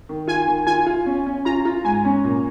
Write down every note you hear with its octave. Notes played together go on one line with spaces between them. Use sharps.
D#3
F4 G#5
D#3
F4 G#5
F4
C#4
C#4
F4 A#5
F4
G#2 G#5
C#4
A#2